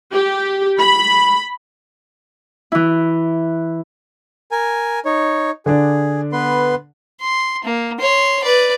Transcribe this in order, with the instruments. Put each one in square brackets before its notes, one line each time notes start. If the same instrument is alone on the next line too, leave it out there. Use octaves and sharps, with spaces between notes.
[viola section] G4
B5
[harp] E3 E4
[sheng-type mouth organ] A#4 G#5
D#4 C#5
[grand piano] D3 D4 [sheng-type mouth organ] G#4
[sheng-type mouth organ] B3 B4 C6
[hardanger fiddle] C6
A#3
C#5 C6
B4 D5